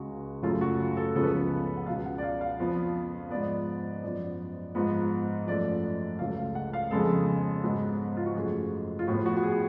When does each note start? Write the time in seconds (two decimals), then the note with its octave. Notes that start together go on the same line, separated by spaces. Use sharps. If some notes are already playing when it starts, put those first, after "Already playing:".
Already playing: C#2 C#3 G#3 F#4
0.42 F#2 C#3 F#3 A3 F4
0.61 F#4
0.97 A4
1.16 C#2 C#3 F3 B3 A4
1.23 B4
1.30 A4
1.77 F#5
1.86 C#2 B2 F#3 F5
2.06 F#5
2.18 D5
2.23 F5
2.41 F5
2.59 F2 F3 B3
3.30 G#2 F3 B3 D5
4.03 F#2 F3 B3 D5
4.75 G#2 F3 B3
5.47 F#2 F3 A3 D5
5.84 D5
6.19 C#2 C#3 F#3 A3 F5
6.37 F5
6.55 F#5
6.73 F5
6.91 F2 C#3 G#3 B3 A4
7.63 G#2 F#3 B3
8.17 F4
8.26 F#4
8.36 F#2 F3 A3 G#4
8.99 F4
9.07 A2 F3 B3 F#4
9.26 F#4
9.37 F#4
9.43 G#4